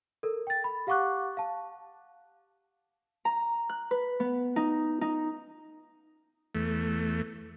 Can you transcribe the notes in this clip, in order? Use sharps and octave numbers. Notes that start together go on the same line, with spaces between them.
A4 A#4
G5 A6
B5
G4 F5 F#5 C#6 D6 F#6
F5 A5
A#5
F#6
B4
B3
D#4
D#4
E2 A3